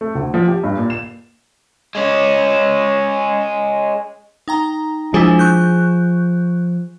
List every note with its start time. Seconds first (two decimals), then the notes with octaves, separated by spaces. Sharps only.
0.01 A3
0.15 D2
0.34 F3
0.48 G4
0.64 G2
0.77 A#2
0.90 E7
1.95 G#3 C#4
4.48 D#4 G5 A#5
5.14 F3 G#3 D4 E4 G#4
5.39 C#6 F#6 G6